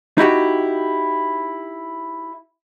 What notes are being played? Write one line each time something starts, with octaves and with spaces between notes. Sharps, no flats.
D#4 E4 F#4 G4